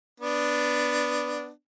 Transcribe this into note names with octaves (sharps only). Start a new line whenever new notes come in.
B3 D4